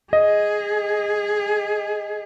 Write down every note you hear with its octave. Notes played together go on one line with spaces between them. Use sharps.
G#4 D#5